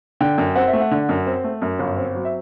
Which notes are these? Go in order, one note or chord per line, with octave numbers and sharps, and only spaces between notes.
D3 G5
F#2
C4 F#5
E5
A3
F#5
D3
F#2
C4
A3
F#2
G1
C4
F#3
E5